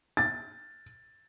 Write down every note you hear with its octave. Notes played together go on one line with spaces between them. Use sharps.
A6